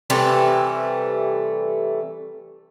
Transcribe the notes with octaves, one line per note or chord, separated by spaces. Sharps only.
C3 E3 G3 A3